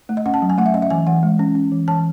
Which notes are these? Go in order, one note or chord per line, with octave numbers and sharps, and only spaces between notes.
A3
D#5
C#4 F#5
A5
F#3
G#5
A3 F#5
E5
C#4 D#5
E5
E3 G#5
E3 F#5
G#3
C#4
C#4
E3
E3 A5